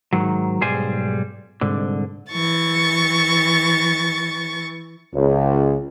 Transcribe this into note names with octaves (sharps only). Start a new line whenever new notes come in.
G#2 D#3 F#3
B1 G#2 G3 G#4 C5 G#5
C2 G#2 D3
E3 C#6 A6
C#2